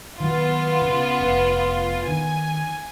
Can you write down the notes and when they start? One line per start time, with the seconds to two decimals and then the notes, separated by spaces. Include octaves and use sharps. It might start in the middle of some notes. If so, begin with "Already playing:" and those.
0.20 D#3 F#3 B3 F4
0.82 C#3
1.20 F1
2.08 D#3 G#5